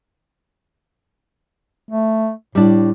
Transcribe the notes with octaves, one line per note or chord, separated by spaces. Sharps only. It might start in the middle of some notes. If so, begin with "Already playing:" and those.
A3
A2 G3 D4